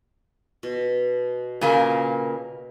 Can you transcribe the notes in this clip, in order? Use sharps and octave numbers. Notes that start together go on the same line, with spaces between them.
B2
A#2 C#3 A#3